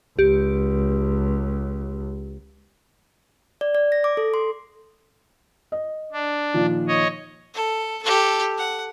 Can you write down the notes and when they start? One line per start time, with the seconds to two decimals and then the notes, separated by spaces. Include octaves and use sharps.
0.19 C#2 G4
3.61 D5
3.75 D5
3.92 A#6
4.04 D6
4.17 A4
4.34 C6
5.72 D#5
6.12 D4
6.54 A#2 D#3 F3
6.88 C#5 D#5
7.54 A4
8.03 G4 A4
8.58 F#5